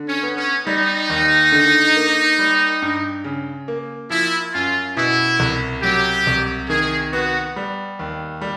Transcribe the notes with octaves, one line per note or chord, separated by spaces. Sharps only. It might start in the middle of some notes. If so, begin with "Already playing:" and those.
Already playing: D3
C#4
B3
C#4
G3 D#4
D#2
D3
A#3
G3
G2
C#3
A#3
F3 E4
F#2 F4
B2 E4
C2
F#3 G4
C2
D#3 G#4
B3 F#4
G3
D#2
G3